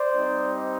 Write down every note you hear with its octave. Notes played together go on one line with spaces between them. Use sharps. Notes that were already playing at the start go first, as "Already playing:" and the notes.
Already playing: C5 D5
G3 C4 D#4 G4